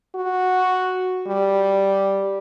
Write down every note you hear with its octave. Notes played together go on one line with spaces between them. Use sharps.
F#4
G3